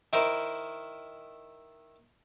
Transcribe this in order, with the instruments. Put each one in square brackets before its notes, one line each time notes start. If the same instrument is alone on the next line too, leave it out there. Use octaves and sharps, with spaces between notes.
[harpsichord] D#3 E4 A#4 C5